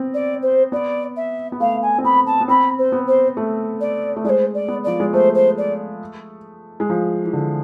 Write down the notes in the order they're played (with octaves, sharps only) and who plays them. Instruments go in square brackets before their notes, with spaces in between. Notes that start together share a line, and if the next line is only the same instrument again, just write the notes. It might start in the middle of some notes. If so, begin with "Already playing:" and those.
Already playing: [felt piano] B3 C4
[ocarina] D5
C5
[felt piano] B3 [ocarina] D5
[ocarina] E5
[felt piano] B3
[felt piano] A3 [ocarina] F5
[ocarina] G#5
[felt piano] C4
[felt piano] B3 [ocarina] B5
[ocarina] A5
[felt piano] B3
[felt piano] C4 [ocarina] B5
[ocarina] C5
[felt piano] B3
[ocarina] C5
[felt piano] A3
[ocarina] D5
[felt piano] A3
[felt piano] G#3 [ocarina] C5 D5
[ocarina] D5
[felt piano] B3
[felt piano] F3 [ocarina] D5
[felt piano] G#3
[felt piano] A3 [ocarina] C5
[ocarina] C5
D5
[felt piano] G#3
F3
E3
D3